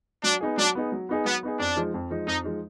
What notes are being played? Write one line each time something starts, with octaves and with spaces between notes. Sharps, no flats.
F#3 D4
B3 D#4 G#4
F#3 D4
B3 D#4 G#4
F#3
B3 D#4 G#4
F#3 B3
B3 D#4 G#4
F2 D4
F3 G#3 D#4
F2
F3 G#3 D#4
F2 D#4
F3 G#3 D#4